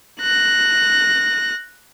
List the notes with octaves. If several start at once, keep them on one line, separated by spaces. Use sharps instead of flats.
F#6 A#6